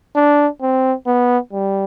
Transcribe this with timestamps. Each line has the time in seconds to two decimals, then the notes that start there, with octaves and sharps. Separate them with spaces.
0.16 D4
0.62 C4
1.06 B3
1.53 G3